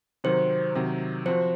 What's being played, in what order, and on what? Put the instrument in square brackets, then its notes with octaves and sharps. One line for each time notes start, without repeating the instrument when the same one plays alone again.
[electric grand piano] C3 D#3 F#3 C4 [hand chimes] C5
[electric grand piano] C3 D#3 F#3 C4
[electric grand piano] F3 C4 F#4 [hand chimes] C5